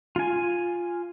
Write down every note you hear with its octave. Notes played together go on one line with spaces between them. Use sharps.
F4 G#5